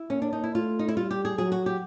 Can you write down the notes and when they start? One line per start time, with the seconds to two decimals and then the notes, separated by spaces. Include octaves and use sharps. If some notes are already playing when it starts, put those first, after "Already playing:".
Already playing: E4
0.10 A#3 C#4
0.22 D4
0.33 D#4
0.44 E4
0.55 A3 F4
0.79 D#4
0.88 E4
0.97 G3 F4
1.11 G4
1.25 G#4
1.38 F#3 G#4
1.52 F#4
1.66 G4